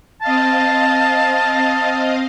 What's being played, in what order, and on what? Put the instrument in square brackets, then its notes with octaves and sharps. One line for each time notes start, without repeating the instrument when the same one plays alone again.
[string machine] C4 D#5 F5 [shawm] A5